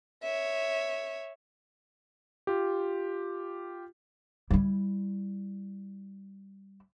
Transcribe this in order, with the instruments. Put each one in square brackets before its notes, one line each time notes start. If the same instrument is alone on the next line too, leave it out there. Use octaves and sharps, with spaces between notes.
[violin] C#5 E5
[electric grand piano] F4 G4
[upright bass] G3 E4